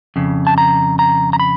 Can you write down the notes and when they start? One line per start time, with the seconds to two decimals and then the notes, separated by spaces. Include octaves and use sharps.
0.16 F2 C#3
0.47 A5
0.58 A#5
0.99 A#5
1.33 A#5
1.40 B5